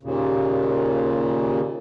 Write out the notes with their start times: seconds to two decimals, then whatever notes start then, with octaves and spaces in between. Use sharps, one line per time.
0.03 D#2 A#2 C#3